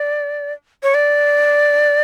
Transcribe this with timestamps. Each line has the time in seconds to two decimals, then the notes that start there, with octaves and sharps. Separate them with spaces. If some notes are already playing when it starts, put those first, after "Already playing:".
Already playing: D5
0.83 C#5
0.94 D5